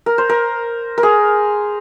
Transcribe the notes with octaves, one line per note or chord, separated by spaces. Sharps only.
A#4
C5
A#4
A#4
G#4